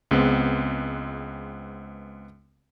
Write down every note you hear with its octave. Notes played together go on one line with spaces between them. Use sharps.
C#2 G#3 B3 C4